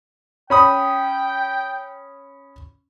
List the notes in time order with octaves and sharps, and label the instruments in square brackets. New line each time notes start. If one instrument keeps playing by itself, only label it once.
[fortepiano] C#4 B5 D#6 [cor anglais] G5